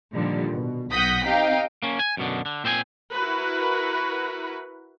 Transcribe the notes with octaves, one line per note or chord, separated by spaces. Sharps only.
A#2 D3 D#3 F3 G3
B2
B1 F#5 D#6 G6 A#6 B6
C4 D#4 G4 F5 G5
A#3 C#4
G#5
F#2 B2 D3
D3
A#2 C4 C5 D5 G#5
E4 F#4 A#4 B4